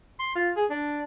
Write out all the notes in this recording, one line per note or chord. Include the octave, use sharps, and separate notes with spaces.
C6
F4
G#4
D4